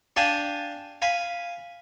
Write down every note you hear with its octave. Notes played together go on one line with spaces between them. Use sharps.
D4 G4 D5 F5 G#5 A5
F5 G#5 B5